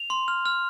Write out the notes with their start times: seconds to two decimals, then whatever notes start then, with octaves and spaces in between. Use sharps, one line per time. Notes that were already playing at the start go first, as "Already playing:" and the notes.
Already playing: F7
0.10 C6
0.28 F6
0.46 F6